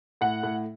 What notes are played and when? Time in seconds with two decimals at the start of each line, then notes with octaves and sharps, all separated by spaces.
0.21 A2 F#5
0.43 A2